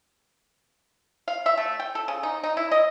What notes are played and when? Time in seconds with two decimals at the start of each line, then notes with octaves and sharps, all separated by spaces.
1.28 F5
1.46 E5
1.57 A3
1.79 G5
1.95 A4
2.08 C#3
2.23 D#4
2.44 D#4
2.57 E4
2.72 D#5